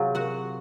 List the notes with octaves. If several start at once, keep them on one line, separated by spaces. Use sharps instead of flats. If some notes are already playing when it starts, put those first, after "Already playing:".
Already playing: C3 F#3 C4 F4 G#4
F#4 F#5